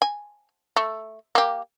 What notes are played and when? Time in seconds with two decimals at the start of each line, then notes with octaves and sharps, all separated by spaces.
0.02 G#5
0.76 A3
1.35 A#3 G4